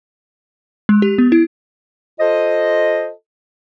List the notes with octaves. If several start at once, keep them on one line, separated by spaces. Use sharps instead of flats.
G#3
G4
B3
E4
F4 A4 C5 D#5